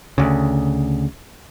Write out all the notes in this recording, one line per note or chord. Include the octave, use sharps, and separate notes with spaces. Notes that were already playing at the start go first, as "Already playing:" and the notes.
D2 C#3